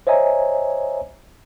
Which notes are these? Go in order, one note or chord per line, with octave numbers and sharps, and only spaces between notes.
C5 C#5 D#5 E5 G#5 A#5